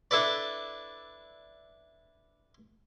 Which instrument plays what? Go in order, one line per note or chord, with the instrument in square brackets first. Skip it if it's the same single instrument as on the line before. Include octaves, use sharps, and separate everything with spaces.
[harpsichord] D4 E4 A4 B4 D5